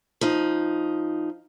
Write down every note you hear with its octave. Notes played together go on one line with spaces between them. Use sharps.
F3 D#4